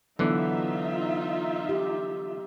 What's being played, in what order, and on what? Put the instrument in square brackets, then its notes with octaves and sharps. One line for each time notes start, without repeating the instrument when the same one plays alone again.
[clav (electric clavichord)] D3 E3 [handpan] F#3 B3 [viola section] D#4 F4 E5
[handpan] G4